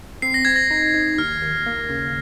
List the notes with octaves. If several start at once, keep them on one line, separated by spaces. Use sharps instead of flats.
C4 C7
A#6
C4 G#6
A#6
D#4
D#4
D#2 F6
D#2
A#3
C#3